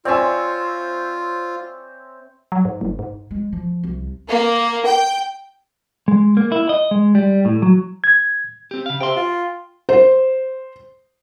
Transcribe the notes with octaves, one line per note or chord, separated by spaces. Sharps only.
C4 F4 C#5 D5 E5 G#5
F#3
G#2
F#1
G#2
G#3
F3
C2
A#3
G5
G#3
A#3
E4
D#5
G#3
G3
A2
F#3
G#6
C4 G4
C#3 F5
C3 G5 C6
F4
C5